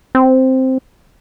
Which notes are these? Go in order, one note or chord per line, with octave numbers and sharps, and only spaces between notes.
C4